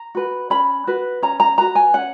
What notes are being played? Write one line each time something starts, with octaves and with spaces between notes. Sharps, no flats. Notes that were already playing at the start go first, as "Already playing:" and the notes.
Already playing: A#5
F#4 B4
C#4 B5
F#4 B4
C#4 A#5
A#5
F#4 B4 A#5
G#5
C#4 F#5